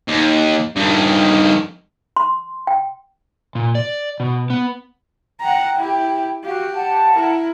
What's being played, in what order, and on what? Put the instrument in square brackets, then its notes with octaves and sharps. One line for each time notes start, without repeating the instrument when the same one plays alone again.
[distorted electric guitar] D#2
G2 D#3
[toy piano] C6
G5
[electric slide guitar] A#2
D5
B2
B3
[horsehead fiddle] F#5 A#5 [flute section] G5
[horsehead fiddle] E4 G4
[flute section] F#4 F5 [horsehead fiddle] G4
[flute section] F#5 A5
[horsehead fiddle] E4 A#4